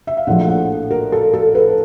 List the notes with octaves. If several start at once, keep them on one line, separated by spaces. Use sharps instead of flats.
E5
F5
A#1 A2 F3 F#5
F#5
A#4
A4
A4
B4